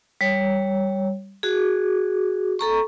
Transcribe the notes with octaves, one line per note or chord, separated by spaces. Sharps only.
G3 C#5
F#4 G#4
A4 A#5 C#6